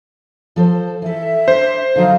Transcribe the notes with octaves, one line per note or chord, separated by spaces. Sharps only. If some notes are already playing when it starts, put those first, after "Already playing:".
F3 A4 C5
E3 A4 E5
D4 C5
D3 F#3 D#4 F5